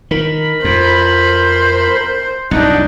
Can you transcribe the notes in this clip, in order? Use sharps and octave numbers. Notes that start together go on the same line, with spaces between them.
D#3 A#4 B5
F2 C5
C2 F#2 D4 D#4 F#5